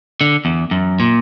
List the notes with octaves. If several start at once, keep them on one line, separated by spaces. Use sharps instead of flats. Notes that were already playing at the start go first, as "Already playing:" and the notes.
D3
E2
F#2
A#2